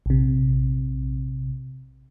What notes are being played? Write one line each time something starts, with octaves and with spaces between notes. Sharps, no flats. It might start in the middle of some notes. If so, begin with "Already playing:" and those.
A#1 C3